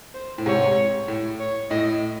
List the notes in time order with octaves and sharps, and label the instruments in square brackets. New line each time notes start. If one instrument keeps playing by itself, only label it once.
[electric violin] C5
[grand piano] A2
[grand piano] G#2 C3 [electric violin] C#5
[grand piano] A2
[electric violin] C#5
[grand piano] A2 [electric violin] D#5